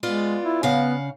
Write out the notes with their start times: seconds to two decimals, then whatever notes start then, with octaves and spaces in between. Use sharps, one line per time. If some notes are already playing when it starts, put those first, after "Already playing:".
0.03 G#3 B3 F4 D5
0.44 E4
0.63 C#3 B3 F5 F#5